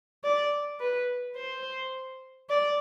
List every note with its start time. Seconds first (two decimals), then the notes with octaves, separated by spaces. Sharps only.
0.24 D5
0.80 B4
1.36 C5
2.50 D5